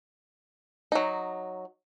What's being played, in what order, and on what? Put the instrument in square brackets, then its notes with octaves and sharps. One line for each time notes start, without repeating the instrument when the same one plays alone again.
[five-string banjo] F#3 D#4